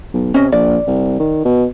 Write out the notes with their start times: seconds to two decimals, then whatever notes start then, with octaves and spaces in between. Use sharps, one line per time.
0.14 B1
0.34 C3 C#4 D#5
0.52 A#1 D5
0.87 C2
1.19 D#3
1.45 B2